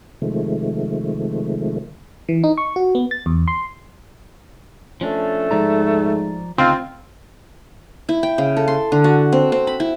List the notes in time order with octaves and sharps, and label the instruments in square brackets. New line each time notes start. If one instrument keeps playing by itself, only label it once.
[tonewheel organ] C3 D#3 F3 G#3 A3
[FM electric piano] E3
D#4
C#6
F#4
B3
A6
E2
C6
[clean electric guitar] F3 C#4 D4 [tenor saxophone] A3
[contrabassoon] G#2 [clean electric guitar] F3 D5 A#5
[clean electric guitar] D2 C#3 D#4 [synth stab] C4 [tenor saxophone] F4
[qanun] E4
G5
C#3
A4
C6
D3
F#4
C4
C4
B5
E4